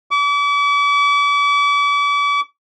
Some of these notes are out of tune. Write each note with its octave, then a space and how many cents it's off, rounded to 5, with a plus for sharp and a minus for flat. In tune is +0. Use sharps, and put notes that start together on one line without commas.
D6 -40